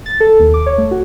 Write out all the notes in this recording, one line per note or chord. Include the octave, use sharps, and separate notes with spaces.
A6
A4
D#2
D6
C#5
A3
F#4